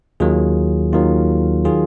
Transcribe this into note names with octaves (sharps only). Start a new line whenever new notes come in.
D#2 D#3 F#3 F4 G#4
D#2 D#3 F#3 F4
D#3 F#3 F4 G#4